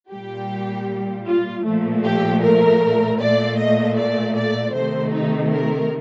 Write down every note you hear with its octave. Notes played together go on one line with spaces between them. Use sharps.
A#2 G3 G4
F4
A#2 F3 A3
G4
A#4
A#2 A3 D5
D#5
D5
D5
C3 D#3 A3 C5
D#4
A#4